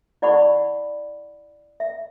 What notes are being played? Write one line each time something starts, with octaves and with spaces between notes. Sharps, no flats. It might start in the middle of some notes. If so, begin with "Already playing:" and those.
E4 D5 F#5 B5 C#6
E5